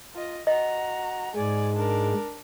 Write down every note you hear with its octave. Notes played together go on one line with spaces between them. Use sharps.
F4 D#5
F#4 D#5 A#5
G#2 G#3 D5 G#5
D4 A#4